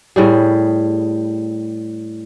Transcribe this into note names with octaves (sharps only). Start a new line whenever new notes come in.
A2 G3 G#4